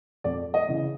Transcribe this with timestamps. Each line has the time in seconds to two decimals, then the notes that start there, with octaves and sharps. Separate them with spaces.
0.24 F2 D5
0.54 D#5
0.69 C#3 E3